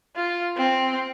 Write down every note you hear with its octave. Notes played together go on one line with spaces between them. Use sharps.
F4
C4